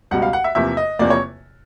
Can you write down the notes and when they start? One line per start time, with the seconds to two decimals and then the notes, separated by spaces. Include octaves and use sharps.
0.11 C#2 B2 G3 F#5
0.22 F5
0.33 F#5
0.44 E5
0.55 E2 C3 F3 A#3 E5
0.77 D#5
0.99 E2 C3 F3 A#3 D5
1.10 C#5